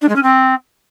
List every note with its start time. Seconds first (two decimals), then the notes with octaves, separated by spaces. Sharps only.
0.02 D4
0.09 G#3
0.16 C#4
0.23 C4